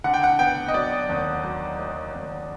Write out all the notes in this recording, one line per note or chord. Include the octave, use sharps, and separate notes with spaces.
D3 F#5
G5
F#5
B3 G5
D#5
F#3 D5
D#2
F#3
F#3
D#2